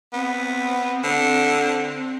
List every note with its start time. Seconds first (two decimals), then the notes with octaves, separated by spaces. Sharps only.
0.12 B3 C4
1.03 D3